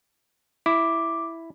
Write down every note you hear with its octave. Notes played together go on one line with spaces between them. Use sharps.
E4 D6